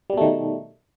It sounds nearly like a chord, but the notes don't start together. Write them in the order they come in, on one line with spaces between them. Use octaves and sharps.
G3 B2 A3 D#3